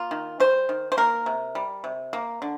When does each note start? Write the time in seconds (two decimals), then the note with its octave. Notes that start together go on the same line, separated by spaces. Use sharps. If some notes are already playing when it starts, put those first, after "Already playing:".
Already playing: A#3 F4
0.11 D#3
0.40 G3 C5
0.69 D#3
0.92 C5
0.97 A#3 A#4
1.26 C3
1.55 G3
1.84 C3
2.13 A#3
2.42 D3